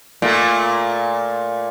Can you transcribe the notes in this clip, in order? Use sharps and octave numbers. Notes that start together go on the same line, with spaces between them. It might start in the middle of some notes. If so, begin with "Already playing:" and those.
A#2 A3